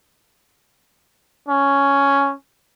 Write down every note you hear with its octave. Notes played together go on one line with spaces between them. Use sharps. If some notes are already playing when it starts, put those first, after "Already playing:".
C#4